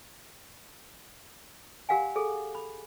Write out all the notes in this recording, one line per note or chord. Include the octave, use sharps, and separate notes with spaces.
G4 A#4 F5 F#5 G#5
G#4 A4
B5